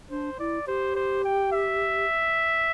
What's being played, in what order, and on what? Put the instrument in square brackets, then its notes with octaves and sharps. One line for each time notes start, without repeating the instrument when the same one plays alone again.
[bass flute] D4 [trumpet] C5
[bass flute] E4 [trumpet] D5
[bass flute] G4 [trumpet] C5
[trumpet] C5
G5
E5